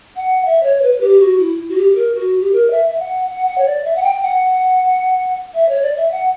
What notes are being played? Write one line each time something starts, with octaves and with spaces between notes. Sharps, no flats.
F#5
E5
C#5
B4
G4
F#4
E4
F#4
G4
G4
A#4
F#4
G4
A#4
E5
E5
F#5
F#5
F#5
C#5
D5
E5
F#5
G5
F#5
E5
C#5
D5
D5
E5
F#5